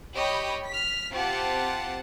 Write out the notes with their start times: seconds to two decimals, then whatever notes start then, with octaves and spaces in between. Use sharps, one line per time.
0.16 G4 C#5 D#5 G5 B5
0.68 F6 B6
1.12 C4 F4 G4 F#5 A5